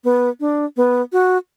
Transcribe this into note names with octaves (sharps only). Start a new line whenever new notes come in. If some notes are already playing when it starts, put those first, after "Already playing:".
B3
D4
B3
F#4